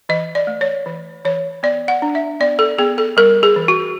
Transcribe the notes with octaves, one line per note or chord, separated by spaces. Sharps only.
E3 D#5
D5
A3
C#5
E3
E3 C#5
B3 D5
F#5
D4
E5
B3 D5
A4
B3 G#4
A4
G3 A#4
G#4
E3
F#4